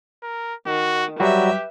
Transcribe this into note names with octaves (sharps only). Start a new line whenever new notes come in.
A#4
D#3 F#4
F#3 G3 F#4 G4 B4 E5